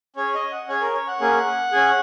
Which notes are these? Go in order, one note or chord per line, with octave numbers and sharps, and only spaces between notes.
C#4 G#4 C#5
D#5
F#5
C#4 G#4 C#5
A#4
C#5
F#5
A#3 C#4 G#4
C#4 G#4